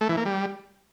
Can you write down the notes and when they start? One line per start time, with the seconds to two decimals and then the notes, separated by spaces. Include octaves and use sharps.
0.01 A3
0.09 E3
0.17 A#3
0.25 G3